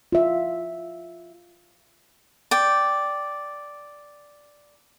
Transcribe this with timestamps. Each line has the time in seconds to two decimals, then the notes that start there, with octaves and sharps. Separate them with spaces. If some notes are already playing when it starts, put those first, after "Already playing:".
0.12 F4 E5
2.51 D5 G5